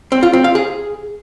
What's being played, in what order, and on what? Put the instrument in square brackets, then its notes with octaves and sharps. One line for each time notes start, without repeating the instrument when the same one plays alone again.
[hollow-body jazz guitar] C4
F4
C4
F5
G#4